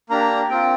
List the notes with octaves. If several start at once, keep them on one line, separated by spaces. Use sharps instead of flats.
A#3 D4 G4 A#5
C4 F4 G5